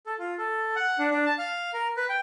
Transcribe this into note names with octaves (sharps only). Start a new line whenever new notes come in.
A4
F4
A4
F#5
D4
D4
A5
F5
A#4
B4
G5